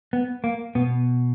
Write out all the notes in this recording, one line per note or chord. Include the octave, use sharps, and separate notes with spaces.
B3
A#3
B2 B3